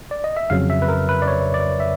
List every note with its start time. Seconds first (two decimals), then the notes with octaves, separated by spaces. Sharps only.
0.11 D5
0.24 D#5
0.37 E5
0.50 F2 C#3 F#3 F5
0.70 E5
0.82 B4
0.89 A#4
1.09 B4
1.22 D5
1.27 C#5
1.54 D5
1.80 E5